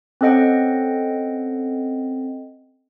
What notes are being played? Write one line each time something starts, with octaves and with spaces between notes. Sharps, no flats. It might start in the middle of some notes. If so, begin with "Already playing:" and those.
C4 C#4 A4 D#5 F#5 G5